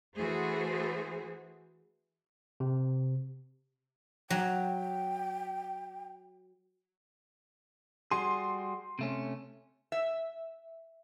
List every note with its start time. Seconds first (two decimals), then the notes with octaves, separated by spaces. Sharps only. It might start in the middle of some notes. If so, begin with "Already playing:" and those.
0.17 E3 A3 F#4 G#4 C5
2.60 C3
4.30 F#3 G5
8.11 G3 F#4 G#4 C6
8.99 C3 A3 C#4
9.92 E5